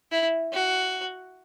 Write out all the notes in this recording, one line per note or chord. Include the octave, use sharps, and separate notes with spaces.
E4
F#4